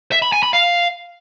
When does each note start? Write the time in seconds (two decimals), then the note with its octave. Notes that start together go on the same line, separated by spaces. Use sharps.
0.12 E5
0.22 B5
0.32 G#5
0.43 B5
0.53 F5